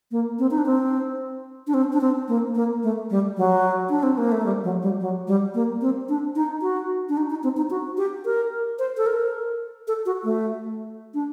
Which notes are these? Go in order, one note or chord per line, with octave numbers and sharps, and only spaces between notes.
A#3
C4
D#4
D4
C4
D4
C4
D4
C4
A#3
A#3
A3
G3
F#3
D4
C4
A#3
A3
G3
F#3
G3
F#3
G3
A#3
C4
D4
D#4
F#4
D4
D#4
D#4
C4
D#4
F#4
G4
A#4
C5
A4
A#4
A4
F#4
A3
D4